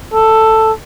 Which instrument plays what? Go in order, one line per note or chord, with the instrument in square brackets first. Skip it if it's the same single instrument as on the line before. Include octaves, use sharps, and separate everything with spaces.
[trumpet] A4